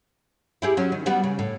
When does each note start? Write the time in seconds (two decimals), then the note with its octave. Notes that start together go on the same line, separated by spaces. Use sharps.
0.62 E4 G4 G#4
0.77 F#3 C#4
0.92 D#3
1.06 G3 B3 F#4
1.24 C#3
1.39 A2